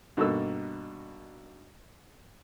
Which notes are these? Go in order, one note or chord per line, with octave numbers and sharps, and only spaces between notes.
G2 B2 A#3 D#4 A4 E6